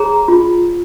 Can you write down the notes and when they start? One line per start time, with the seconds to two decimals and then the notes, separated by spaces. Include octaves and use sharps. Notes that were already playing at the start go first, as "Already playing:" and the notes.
Already playing: G#4 C#5 A#5
0.28 F4